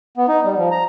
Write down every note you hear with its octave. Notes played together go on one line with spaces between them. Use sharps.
B3
D#4
G3
F3
A#5